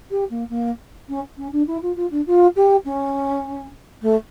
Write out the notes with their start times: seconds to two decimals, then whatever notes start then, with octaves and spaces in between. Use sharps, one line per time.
0.10 G4
0.30 A#3
0.49 A#3
1.09 C#4
1.37 C#4
1.52 D4
1.67 E4
1.82 F4
1.96 F4
2.11 D4
2.26 F4
2.56 G4
2.85 C#4
4.01 A3